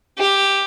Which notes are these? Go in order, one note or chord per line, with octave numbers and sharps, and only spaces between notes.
G4